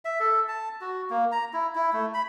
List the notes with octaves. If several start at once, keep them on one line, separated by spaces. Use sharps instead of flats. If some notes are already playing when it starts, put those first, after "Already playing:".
E5
A4
A5
F#4
A#3
A#5
E4
E4
A3
B5